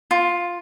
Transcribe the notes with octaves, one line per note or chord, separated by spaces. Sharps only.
F4